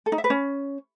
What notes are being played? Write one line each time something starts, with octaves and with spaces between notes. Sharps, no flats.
A4
D#4
E5
B4
C#4